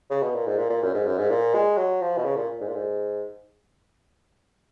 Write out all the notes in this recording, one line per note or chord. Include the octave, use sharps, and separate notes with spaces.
C#3
B2
A#2
G#2
A#2
A#2
F#2
G#2
F#2
G#2
A#2
G#3
F#3
F3
B2
C#3
A#2
G#2
A#2
G#2